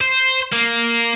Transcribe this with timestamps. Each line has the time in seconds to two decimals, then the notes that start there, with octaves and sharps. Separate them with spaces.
0.01 C5
0.53 A#3